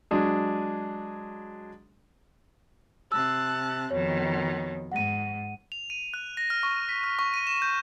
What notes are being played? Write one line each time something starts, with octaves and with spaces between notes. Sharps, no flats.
F#3 G#3 D4 G#4
C3 A5 E6 F#6
F2 B2 D#3 C#5
G#2 F#5 D#7
F7
D#7
F#6
A#6
F6
C#6
B6
F6
C#6
D#7
E7
G6